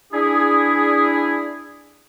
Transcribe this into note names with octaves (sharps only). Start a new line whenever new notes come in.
D4 E4 G#4